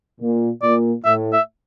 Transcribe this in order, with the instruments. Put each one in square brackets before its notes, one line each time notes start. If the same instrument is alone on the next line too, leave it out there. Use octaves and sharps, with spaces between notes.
[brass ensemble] A#2
[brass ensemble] A#2 [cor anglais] D5
[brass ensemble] A2 [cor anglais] E5
[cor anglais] E5